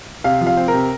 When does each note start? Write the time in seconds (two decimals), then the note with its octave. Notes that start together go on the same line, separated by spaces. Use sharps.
0.24 C3 F5
0.41 F3
0.47 F5
0.57 C4
0.68 A#4
0.73 C3